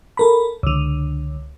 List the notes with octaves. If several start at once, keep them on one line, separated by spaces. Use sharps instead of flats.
A4 A#4 B5
C#2 D3